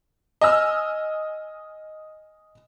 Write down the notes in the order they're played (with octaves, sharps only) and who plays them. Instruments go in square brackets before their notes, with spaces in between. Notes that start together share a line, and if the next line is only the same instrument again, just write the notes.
[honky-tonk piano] D#5 G#5 E6 F6